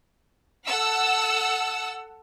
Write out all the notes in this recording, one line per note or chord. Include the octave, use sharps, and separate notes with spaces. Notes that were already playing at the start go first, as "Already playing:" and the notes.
A4 F#5 E6